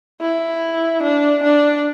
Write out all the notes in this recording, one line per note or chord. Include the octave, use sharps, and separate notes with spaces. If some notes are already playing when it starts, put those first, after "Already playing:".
E4
D4
D4